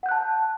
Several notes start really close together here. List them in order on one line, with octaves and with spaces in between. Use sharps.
F#5 G6 F#6 A5